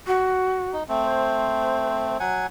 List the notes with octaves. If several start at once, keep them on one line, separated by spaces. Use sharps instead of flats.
F#4
D#4
A3 C4
C5
F#3 F#5 G#5